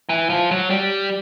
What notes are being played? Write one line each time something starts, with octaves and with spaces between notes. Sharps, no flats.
E3
F3
F#3
G3